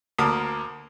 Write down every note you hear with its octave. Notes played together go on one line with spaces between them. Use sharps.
D2 A#3 A5 D#6